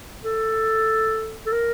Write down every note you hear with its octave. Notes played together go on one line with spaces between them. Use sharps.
A4
A4
A#4